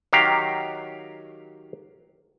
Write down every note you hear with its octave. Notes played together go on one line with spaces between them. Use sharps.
D#3 F#3 G4 F5 A#5